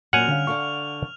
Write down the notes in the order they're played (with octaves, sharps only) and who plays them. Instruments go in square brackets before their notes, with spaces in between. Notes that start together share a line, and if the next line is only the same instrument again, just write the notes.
[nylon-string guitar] F#2 A#2 F#3 [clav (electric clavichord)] F#5 G#5 [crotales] F6 F7
[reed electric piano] D3 F5 [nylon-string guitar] G3 C#4
[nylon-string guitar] D3 A4 F5 [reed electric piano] C#6